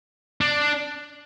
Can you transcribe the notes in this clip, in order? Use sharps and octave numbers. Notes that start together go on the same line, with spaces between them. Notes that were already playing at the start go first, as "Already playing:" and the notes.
D4